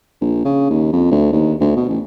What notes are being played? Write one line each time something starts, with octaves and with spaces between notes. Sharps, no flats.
A#1
C#3
D#2
F2
D2
D#2
D2
B2
A1